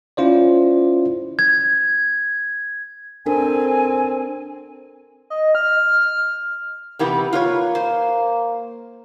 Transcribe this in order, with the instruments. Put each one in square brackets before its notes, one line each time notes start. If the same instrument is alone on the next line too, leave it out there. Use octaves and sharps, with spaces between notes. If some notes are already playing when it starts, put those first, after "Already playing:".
[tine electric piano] C#4 E4 F4 C5 D5
[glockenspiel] G#6
[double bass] C4 [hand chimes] D4 A4 A#4 [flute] G#5
[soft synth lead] D#5
F6
[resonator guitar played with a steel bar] C3 E3 B3
[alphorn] A#3 [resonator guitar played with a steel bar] F4 B4 C#5
[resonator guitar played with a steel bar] C5